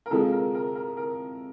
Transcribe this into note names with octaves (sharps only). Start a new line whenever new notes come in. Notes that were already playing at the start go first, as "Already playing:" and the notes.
A#4
C3 F3 G#3 A4
A#4
A#4
A#4
A#4